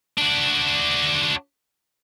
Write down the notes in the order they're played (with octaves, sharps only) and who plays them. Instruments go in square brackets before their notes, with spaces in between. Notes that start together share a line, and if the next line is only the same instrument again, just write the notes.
[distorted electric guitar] D4 F#4